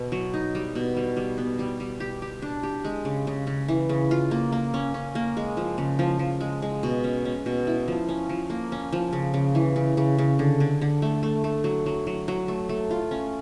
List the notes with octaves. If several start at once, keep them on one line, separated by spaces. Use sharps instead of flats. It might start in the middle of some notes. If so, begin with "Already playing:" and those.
Already playing: B2 B3
F#3
D#4
G3
B2
G3
G3
B3
G3
G3
G4
G4
D4
G4
G#3
C#3
C#3
C#3
E3
C#3
F4
A#3
A#3
C#4
C#4
A#3
G#3
F3
C#3
F3
F3
G#3
G#3
B2
C#4
C#4
B2
E4
F3
C#4
F3
A#3
C#4
F3
C#3
C#3
E3
C#3
C#3
C#3
D3
D3
D3
A3
A3
A3
F#3
F#3
F#3
F#3
A3
A3
F4
C#4